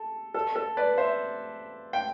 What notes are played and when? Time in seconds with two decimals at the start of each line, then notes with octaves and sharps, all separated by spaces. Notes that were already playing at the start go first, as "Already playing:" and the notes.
Already playing: A4
0.34 A4
0.56 A4
0.77 B4 D5
0.98 C5 E5
1.93 G5